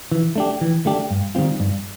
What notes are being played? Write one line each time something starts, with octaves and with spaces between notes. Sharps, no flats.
E3
A3 D4 G4
E3
A3 D4 G4
G2
D#3 G3 C4 F4
G2